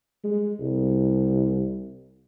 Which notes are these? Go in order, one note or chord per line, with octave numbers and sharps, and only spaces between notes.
G#3
C2